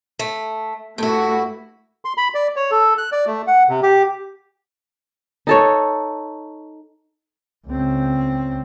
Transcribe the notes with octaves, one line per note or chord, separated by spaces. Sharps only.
A3
G2 A3 E4 F#4
C6
B5
D5
C#5
A4
F#6
D5
A3
F#5
C3
G4
D#4 A4 C#5
C#2 C4